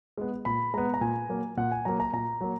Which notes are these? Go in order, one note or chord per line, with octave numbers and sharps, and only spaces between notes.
G#3 B3
A#2 B5
G#3 B3 A#5
A#5
A#2 G#5
F#3 A#3
A#2 F#5
G#5
F#3 A#3 A#5
A#5
A#2 A#5
F#3 A#3